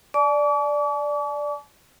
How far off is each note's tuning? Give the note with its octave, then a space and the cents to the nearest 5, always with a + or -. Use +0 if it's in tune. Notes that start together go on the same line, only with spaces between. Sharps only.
D5 +0 A5 -45 D6 -45